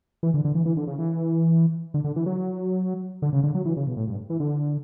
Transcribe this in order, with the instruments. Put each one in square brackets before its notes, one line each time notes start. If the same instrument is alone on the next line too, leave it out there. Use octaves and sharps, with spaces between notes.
[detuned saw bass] E3
D3
D3
E3
E3
D3
C#3
E3
D3
D3
E3
F#3
D3
C#3
D3
F#3
E3
C#3
B2
A2
G2
E3
D3